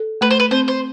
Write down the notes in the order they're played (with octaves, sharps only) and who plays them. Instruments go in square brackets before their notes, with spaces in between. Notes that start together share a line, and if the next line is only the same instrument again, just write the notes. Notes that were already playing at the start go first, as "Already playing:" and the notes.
Already playing: [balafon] A4
[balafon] A3 [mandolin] B4
[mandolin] C5
B4
[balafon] C4 [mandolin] C5
[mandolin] C5